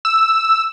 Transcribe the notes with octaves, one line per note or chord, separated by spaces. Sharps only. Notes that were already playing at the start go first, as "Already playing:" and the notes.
E6